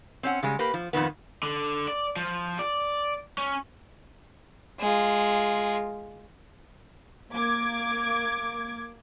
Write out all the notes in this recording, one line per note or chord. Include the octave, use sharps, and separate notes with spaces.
C4 C#4 F#5
C#3 G3 G#3
A#3 G4 B4
F3
F2 A#2 D#3 B3
D3
D5
F3
D5
C#4
G#3 F4
A#3 D6 G#6